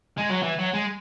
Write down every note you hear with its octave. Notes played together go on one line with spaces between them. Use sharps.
G#3
F#3
E3
F#3
G#3